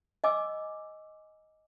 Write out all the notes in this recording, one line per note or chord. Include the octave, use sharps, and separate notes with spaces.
D#5 G#5 D6 E6